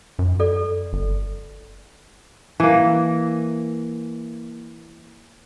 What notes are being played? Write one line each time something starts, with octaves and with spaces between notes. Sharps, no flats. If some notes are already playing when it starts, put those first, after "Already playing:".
F#2
A4 D5
G1
E3 A#3